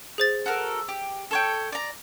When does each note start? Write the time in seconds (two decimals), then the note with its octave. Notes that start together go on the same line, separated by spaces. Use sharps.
0.18 G#4 C5 A6
0.46 F#4 A4 A#4
0.89 G4
1.31 A4 C#5 G5
1.72 D5 A#5